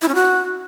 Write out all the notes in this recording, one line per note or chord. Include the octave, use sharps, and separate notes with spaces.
E4
C#4
F#4